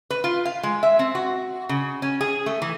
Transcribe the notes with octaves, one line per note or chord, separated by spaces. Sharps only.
B4
F4
F5
G#3
E5
C4
F#4
C#3
C#4
G#4
A3
E3